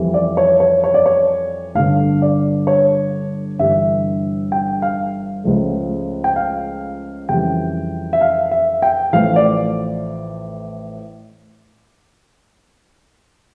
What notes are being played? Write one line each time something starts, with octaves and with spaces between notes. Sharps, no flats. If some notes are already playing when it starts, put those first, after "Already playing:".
Already playing: F2 E3 G3
D5
C#5
C#5
C#5
D5
C#5
G1 G2 D3 F5
D5
C#5
G1 G2 E3 G3 E5
G5
F5
C#2 C#3 F3 A3
G5
F5
F2 C#3 E3 G3 G5
E5
F5
E5
G5
A1 A2 F3 A3 F5
D5